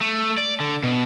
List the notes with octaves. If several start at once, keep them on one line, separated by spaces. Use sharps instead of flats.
A3
D5
D3
B2